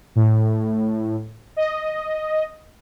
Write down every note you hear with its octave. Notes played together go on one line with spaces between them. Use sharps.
A2
D#5